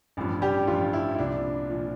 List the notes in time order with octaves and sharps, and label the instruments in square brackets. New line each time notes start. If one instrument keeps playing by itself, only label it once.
[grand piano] A1 G2 F3
G3 G4
A1 G2 F3 F4
E4
E4
C2 A#2 F3 D4
A#2 F3